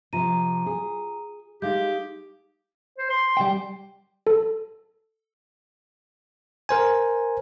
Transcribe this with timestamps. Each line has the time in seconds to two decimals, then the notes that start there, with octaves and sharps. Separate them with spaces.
0.13 C3 F3 F4 A#5 D#7
0.66 G#4
1.62 G#3 D#4 G4 F5 G6
2.98 C5
3.10 C6
3.37 G3 G5
4.27 A4
6.69 A#4 C5 G#5